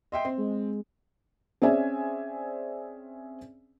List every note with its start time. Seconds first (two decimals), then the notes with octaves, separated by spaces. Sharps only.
0.12 D#5 E5 G5 C6
0.25 C4
0.38 G#3
1.62 C4 C#4 G#4 D5 E5 G#5